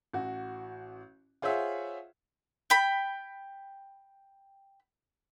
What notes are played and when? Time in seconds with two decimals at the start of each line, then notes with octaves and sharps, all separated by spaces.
0.14 A1 F#4
1.42 F4 G#4 C5 C#5 E5 F#5
2.70 G5 B5